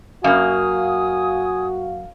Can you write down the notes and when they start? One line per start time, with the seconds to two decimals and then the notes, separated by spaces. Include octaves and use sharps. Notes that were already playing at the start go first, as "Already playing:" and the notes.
0.24 F#2 A#3 F#4 F5 G#5 D#6